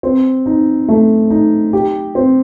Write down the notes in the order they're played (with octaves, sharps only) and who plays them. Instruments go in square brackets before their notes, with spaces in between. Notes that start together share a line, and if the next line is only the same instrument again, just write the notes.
[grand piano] C4
D#4
A3
D#4
G4
C4